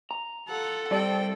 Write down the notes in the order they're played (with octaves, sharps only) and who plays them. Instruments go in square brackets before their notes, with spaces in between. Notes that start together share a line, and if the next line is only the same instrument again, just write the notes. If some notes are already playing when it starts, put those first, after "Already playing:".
[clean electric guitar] A#5
[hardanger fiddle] F4 F#5 [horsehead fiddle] A4
[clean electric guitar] C2 D5 [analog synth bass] G3 [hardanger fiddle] C4 G5